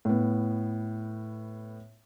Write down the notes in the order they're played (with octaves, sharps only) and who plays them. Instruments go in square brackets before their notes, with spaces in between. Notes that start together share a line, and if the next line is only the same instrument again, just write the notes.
[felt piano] A2 B3